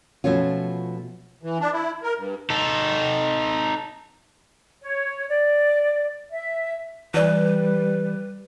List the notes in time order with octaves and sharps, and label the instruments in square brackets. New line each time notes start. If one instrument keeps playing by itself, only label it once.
[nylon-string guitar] B2 F3 A3 C#4 F4
[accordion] E3
D4
E4
A#4
G2
[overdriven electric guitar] D#4 A4
[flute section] C#5
D5
E5
[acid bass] E3 [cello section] G3 [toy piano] E4 D5 [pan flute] B4